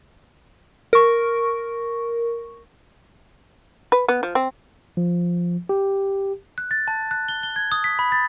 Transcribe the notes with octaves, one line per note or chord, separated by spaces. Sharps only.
A#4 C#6
B4
B3
F3
C4
F3
G4
F#6
A6
A5
F#6
G7
G7
G#6
D#6
B6
B5
A6